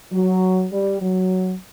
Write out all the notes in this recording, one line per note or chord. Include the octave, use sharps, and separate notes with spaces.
F#3
G3
F#3